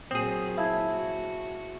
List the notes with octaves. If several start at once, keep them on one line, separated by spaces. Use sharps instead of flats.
A#2 F#3 C4 G#4 D#6
E4 F5 A5 G#6
F#4